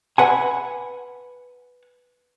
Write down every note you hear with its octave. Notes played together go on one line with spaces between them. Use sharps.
B4 F#5 G#5